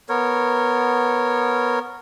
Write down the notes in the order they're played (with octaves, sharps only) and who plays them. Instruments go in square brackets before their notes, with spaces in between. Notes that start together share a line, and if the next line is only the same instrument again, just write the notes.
[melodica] B3 A#4 C#5